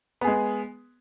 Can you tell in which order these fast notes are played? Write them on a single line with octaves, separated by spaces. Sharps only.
B3 G#4 G#3